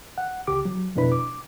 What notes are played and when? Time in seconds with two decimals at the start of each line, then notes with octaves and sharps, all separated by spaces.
0.18 F#5
0.47 C#2 G4 D6
0.65 F#3
0.95 F2 B2 D4 E4 B4 B5
1.12 D6